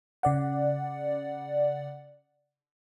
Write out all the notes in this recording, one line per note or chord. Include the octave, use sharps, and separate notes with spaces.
C#3 D5 F#5